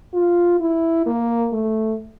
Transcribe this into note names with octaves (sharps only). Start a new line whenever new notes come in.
F4
E4
A#3
A3